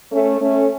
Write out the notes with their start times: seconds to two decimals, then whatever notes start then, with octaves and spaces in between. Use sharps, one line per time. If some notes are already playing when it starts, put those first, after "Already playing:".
0.12 A3 C#4
0.41 A3 C#4